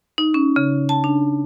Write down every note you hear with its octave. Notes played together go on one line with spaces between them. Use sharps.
D#4
C#4
C#3
A5
D4